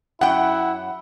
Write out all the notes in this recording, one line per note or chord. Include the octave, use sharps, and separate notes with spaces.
F#2 E4 F#5 G5